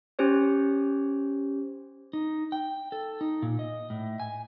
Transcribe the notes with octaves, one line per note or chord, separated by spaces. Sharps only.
C#4 G4 C5 C#5
D#4
G5
A4
D#4
A#2
D#5
A2
G#5